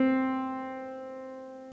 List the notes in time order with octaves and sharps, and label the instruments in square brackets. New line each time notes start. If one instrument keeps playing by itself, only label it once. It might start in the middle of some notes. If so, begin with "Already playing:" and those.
Already playing: [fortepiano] C4